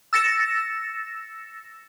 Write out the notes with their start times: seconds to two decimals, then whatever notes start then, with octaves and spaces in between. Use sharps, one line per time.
0.13 E6 A6 A#6 C#7 E7